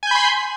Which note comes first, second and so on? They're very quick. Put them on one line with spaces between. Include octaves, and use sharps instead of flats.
G#5 G6 B5 C6